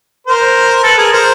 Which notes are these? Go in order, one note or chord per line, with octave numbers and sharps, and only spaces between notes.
A#4 C5
A4 B4
G#4 A#4
A#4 C5